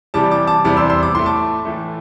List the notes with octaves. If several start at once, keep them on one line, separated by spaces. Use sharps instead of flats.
C3 E3 G3 A5 D6
A5 D6
A5 D6
E2 C3 E3 G3 A5 D6
C6 E6
C6 E6
D6
A2 A3 C6
A5 D6
A2 E3 A3